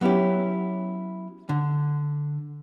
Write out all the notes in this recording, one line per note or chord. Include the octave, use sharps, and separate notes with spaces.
F#3 B3 C#4 E4 G4
D3